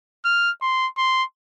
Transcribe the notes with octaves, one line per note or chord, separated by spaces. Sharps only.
F6
C6
C6